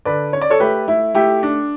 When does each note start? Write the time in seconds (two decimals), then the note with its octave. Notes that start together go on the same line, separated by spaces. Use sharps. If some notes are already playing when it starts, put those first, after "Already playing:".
0.05 D3 B4 D5
0.33 C#4 C#5
0.41 D5
0.50 A4 C#5
0.60 A3 G4 B4
0.88 A3 E4
1.15 A3 E4 G4
1.43 D4